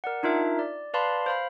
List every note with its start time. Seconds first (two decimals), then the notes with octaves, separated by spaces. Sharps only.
0.04 A#4 D5 F#5
0.23 D4 D#4 F4 A#4 E5
0.59 D5
0.94 B4 D5 F5 A5 B5 C6
1.26 C5 F5 B5